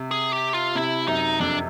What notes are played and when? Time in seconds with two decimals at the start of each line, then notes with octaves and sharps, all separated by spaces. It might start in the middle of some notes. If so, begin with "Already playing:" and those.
Already playing: C3
0.11 G#4
0.33 G4
0.54 F4
0.75 C3 E4
1.08 F#2 D#4
1.40 F2 D4